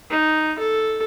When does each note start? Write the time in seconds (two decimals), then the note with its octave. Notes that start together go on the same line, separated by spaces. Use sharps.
0.10 D#4
0.58 A4